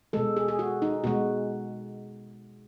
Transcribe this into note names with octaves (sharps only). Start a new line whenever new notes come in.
B2 G#3 A4
G#4
G#4
F#4
D#4
B2 G#3 F#4